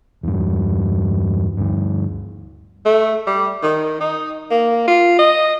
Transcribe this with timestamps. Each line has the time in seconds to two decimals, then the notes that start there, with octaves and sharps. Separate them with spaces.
0.23 E2 G2
1.57 D2 G2
2.85 A3
3.27 G3
3.63 D#3
4.00 D#4
4.51 A#3
4.87 F4
5.19 D#5